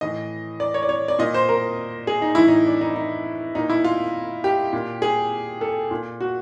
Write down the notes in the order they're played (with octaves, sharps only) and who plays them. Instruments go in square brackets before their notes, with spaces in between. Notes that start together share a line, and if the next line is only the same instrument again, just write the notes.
[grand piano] A2 E3 D#5
D5
C#5
D5
C#5
D5
A#2 D#5
C5
A#4
G#4
D#4
A2 E3 E4
D#4
D4
D#4
D#4
A#2 D#4
E4
F4
G4
A#2
G#4
A4
A#2
F#4